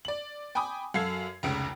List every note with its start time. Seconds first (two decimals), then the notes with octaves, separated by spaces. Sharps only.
0.05 D5 F#7
0.55 G5 G#5 B5 D6 D#6
0.94 F#2 F#4 A4 F5 G#6 C7
1.43 F1 C#2 C#3 D7